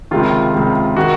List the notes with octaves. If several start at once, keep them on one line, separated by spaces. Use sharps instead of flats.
C#2 C3 D#3 F4
C#2 C3 D#3
D#3 F#4